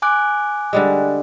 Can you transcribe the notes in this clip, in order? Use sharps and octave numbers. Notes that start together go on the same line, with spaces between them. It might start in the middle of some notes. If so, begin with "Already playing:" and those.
G#5 D6 F#6
D3 G3 G#3